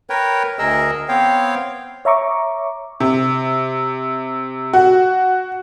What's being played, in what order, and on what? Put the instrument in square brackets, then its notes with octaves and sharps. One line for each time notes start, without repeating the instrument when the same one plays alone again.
[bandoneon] A#4 B4 C#5 G5
D2 G#4 A#4 D#5 E6
B3 C4 C#5 F5 G5
[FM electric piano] C#5 E5 A#5 C#6 D6
[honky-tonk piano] C3
F#4